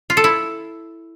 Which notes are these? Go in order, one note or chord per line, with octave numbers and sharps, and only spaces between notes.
F4
A4
E4